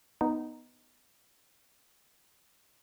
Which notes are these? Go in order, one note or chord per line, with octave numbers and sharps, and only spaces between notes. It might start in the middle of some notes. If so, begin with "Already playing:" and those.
B3 D#4